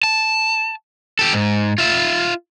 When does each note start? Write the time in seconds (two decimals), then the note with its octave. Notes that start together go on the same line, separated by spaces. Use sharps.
0.03 A5
1.19 G4 A4
1.33 G#2
1.78 F4 E5